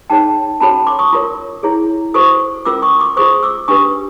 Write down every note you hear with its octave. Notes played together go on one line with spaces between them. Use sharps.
D#4 G#4 C#5 G5 A5
C#4 F#4 A4 C#5 A5 B5
C6 D6
C#6 D#6
F4 A#4 C#5
E4 G#4 C#5
F#4 A4 C5 C#6 D#6
C#4 F4 A#4 D6 E6
C#6 D#6
C6 D6
F4 G#4 C5 C#6 D#6
D6 E6
D4 G4 B4 C#6 D#6